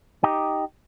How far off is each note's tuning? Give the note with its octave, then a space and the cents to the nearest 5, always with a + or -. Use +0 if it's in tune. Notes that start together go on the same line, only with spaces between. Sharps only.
D#4 +0 G4 +0